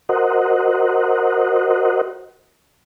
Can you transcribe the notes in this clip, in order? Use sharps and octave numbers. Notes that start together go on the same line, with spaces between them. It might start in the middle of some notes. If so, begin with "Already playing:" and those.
F#4 A#4 C5 D#5 F#5